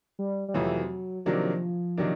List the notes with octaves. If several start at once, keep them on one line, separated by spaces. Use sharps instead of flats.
G3
G3
F2 C3 E3 F#3 A3 C4
C3 D#3 F3 F#3 A#3 D4
C3 D#3 F#3 A#3 D4